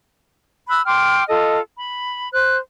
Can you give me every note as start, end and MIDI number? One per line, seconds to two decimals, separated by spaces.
0.69 0.81 83
0.69 0.81 88
0.69 0.81 90
0.85 1.23 79
0.85 1.23 84
0.85 1.23 86
0.85 1.23 89
1.27 1.59 65
1.27 1.59 69
1.27 1.59 75
1.78 2.29 83
2.33 2.58 72
2.33 2.58 90